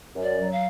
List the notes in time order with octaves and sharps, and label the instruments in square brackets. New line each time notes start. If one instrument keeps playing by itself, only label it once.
[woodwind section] F#2
[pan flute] D5
[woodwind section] F#3
[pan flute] F5